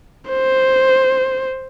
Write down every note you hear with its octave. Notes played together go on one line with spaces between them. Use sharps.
C5